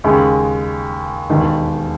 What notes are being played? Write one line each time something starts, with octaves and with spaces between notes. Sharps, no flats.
D#2 C#3 G#3
E1 D#2 D#3